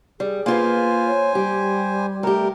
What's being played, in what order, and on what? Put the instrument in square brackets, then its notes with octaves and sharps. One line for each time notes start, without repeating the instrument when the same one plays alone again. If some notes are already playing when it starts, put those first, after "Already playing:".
[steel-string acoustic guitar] G3 [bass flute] G#4
[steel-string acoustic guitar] A#3 F4 B4 [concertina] C5 G#5
[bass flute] C#5
[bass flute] G3 [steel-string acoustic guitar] G4
[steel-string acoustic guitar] A3 G4 [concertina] A#4